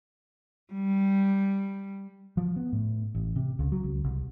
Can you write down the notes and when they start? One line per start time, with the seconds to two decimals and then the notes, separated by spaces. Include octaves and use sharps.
0.74 G3
2.37 F3
2.56 B3
2.72 A2
3.15 A1
3.36 C3
3.59 C#2
3.72 F#3
3.84 C#2
4.04 C2